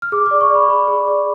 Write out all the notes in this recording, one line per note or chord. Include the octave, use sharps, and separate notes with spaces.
F6
G#4 D6
D5 D6
C#6
D5 B5
C#6
G#4 B5
G#4
D5